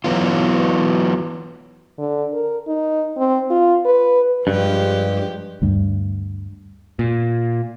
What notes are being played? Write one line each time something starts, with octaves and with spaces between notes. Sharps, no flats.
E3 F#3 B3 F4
D3
A#4
D#4
C4
F4
B4
G2 F3 G#3 G4
D2 G2
A#2